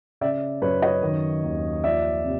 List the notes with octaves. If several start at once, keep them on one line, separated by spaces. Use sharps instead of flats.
C#3 D5 E5
F#2 B4 C#5
C#5 D#5
D#3
D#2
F3 D5 E5
C3